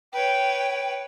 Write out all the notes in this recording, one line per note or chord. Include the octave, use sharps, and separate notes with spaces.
B4 C#5 G5